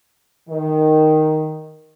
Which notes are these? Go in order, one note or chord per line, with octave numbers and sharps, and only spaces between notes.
D#3